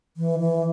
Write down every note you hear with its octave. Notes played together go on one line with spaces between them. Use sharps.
E3
E3